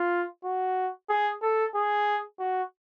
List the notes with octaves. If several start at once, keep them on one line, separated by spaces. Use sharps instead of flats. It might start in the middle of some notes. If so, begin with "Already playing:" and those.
Already playing: F4
F#4
G#4
A4
G#4
F#4